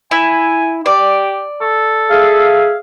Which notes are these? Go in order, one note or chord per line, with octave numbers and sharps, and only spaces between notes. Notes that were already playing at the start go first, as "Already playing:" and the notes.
E4 G#5
G4 D5
A4
G#4 E5 F5